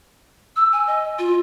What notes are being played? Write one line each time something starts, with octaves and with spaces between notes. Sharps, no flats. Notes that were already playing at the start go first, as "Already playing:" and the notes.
E6
G#5
D#5
F4